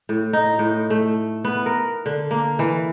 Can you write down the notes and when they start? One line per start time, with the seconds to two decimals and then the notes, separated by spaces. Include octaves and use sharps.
0.09 A2
0.33 D#4
0.59 A2
0.90 A3
1.45 B3
1.66 A#4
2.06 D3
2.31 A#3
2.59 E3